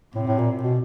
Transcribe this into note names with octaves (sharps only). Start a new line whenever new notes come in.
A2 C3
A2
A#2
B2